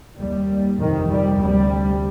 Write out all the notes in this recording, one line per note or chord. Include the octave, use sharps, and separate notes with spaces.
D#2 G3
F2 C3 D#3
G3
D2 C3 G3